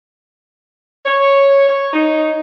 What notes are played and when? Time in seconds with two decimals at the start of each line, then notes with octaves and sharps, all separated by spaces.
1.06 C#5
1.69 C#5
1.93 D#4